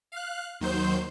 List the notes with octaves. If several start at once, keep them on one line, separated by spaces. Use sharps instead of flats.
F5 F#6
D#2 D#3 F#3 C5 G6